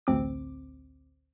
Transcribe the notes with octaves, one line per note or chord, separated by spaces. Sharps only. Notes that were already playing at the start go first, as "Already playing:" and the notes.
A1 D2 C4 D6